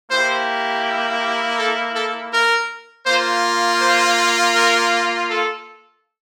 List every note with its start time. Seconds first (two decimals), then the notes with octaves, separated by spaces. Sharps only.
0.10 A#3 E4 G4 C5
1.21 G4
1.59 A4
1.96 A4
2.33 A#4
3.06 A#3 F4 C5
3.80 C5
4.55 A#4
5.28 A4